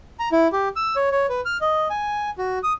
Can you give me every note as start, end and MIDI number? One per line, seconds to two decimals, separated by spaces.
0.20 0.29 82
0.32 0.48 64
0.53 0.69 67
0.76 0.96 88
0.96 1.09 73
1.12 1.26 73
1.29 1.41 71
1.45 1.57 89
1.61 1.88 75
1.90 2.30 80
2.38 2.59 66
2.63 2.73 87